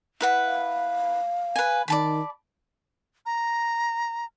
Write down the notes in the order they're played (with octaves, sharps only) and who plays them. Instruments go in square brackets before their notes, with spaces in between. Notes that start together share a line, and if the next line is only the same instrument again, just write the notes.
[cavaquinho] E4 B4 F#5
[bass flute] F5
[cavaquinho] B4 G#5
[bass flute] D#3 [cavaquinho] D5 A5 B5
[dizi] A#5